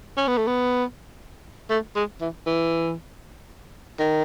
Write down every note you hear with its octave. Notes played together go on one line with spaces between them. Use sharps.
C#4
B3
A3
B3
A3
G#3
E3
E3
D#3